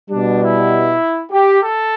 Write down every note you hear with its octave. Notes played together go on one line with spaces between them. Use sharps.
B2 G3 D4
E4
G4
A4